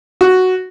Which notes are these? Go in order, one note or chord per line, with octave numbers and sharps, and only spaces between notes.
F#4